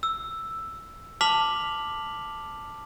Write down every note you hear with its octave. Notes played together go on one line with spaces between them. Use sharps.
E6
A5 D6 F6 B6 F7 F#7